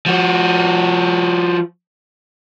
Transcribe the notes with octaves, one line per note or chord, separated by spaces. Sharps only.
F3 F#4